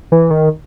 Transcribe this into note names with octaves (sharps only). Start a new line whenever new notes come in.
E3
D#3